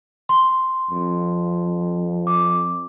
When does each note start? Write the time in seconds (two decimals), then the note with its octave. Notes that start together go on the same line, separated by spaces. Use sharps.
0.29 C6
0.90 F2
2.27 D6